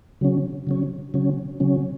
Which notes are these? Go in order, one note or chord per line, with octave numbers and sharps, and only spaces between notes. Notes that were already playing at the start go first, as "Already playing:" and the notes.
C#3 F#3 C#4
C#3 F#3 C#4
C#3 F#3 C#4
C#3 F#3 C#4